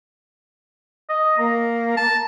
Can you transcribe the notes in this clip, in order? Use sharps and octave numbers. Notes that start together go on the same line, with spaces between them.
D#5
A#3 A#5
A5